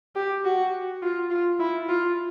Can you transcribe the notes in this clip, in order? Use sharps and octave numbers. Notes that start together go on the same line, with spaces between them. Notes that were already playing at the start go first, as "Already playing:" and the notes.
G4
F#4
F4
F4
E4
F4